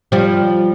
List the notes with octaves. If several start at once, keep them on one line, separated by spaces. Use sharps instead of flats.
F3 G3